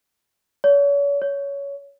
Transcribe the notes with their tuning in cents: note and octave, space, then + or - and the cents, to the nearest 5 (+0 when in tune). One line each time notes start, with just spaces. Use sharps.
C#5 +40
C#5 +15